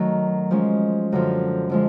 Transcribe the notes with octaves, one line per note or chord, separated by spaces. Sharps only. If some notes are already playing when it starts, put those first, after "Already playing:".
Already playing: D#3 F#3 A3
F3 G#3 C#4
F#2 D3 F3
D3 F3 G#3